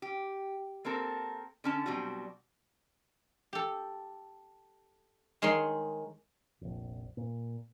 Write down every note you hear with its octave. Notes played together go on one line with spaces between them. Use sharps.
G4
A#3 C4 A4 A#4
D3 C#4 A5
B2 F#3 G3 C4 F#4
G4 A4
D#3 G#3 D#4 C#5 C6
F1 A#1
A#2